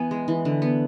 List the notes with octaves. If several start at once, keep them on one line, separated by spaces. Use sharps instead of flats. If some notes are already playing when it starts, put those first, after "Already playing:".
Already playing: E3 B3 G#5
G#3
E3
D3
B3